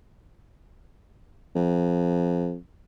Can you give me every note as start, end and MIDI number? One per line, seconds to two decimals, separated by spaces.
1.56 2.57 41